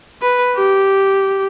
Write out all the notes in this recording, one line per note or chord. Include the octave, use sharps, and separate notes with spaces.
B4
G4